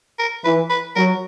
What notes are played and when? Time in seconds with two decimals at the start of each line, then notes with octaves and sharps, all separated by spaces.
0.19 A#4
0.45 E3 B4
0.70 B4
0.96 F#3 A#4